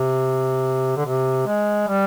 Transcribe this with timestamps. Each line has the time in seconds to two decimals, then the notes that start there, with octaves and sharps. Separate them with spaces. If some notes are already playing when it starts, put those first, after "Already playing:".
Already playing: C3
0.97 D3
1.06 C3
1.47 G#3
1.88 G3